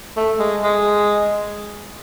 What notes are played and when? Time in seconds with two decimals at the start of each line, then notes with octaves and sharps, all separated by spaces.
0.16 A3
0.39 G#3
0.63 G#3